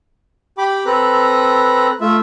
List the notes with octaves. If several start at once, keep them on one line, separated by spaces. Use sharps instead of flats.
G4 G5 B5 D6
C4 A4 B4 A#5 F#6
A3 F4 E5